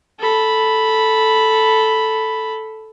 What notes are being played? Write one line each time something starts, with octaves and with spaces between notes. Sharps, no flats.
A4 B5